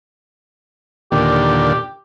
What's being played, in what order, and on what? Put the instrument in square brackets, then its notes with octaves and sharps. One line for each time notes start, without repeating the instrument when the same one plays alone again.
[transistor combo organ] D#2 A#2 D3 [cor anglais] G4